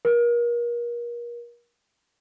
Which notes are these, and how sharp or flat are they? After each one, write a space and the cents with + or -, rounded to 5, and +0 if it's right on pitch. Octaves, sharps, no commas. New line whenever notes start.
A#4 +35